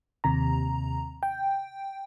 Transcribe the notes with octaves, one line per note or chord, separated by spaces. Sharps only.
D#2 C3 A#5
G5